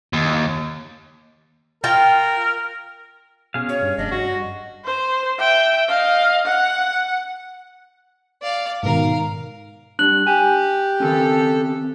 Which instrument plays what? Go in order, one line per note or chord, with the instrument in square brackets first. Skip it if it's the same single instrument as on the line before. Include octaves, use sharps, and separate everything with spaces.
[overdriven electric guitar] D#2
[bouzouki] F4 G5 [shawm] A#4
[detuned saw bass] B2 [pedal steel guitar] C#4 G#4 F5
[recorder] C#5
[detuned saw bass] G2
[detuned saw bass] F1 [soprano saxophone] D4 [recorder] D#5
[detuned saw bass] G2 [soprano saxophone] F#4
[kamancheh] C5
E5 G5
D#5 F5
F#5
[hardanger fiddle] D5 F5
[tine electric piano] G#2 B2 D#3 [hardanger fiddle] A#4 F5
[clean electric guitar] G3 D4 [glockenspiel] F#6 F#7
[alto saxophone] G4 [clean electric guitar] G#5
[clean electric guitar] D#3 C4 C#4 [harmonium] A4